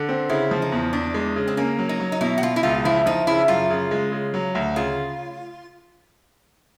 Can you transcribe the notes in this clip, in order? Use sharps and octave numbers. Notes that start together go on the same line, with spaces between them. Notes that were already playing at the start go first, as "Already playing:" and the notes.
Already playing: D3
C4
C#3 E4
F3
D#4
E2
E2 D4
G#3
C#3
C4
A#3 C#4
F#3
D#4
F#3
D#4
B2 E4
F#4
B2 F4
E4
C#2 F4
F3 E4
F3 D#4
C#3 E4
F#2 F4
C#3
G#3
C#3
F#3
D2
C#3 F4